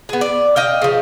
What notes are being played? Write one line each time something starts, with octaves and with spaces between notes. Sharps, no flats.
B3 G#4
D5
D#5 F5 G5
C#3 F3